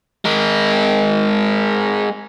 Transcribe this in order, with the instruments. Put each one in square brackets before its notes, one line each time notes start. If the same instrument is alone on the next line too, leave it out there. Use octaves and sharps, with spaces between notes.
[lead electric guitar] G#3 A#4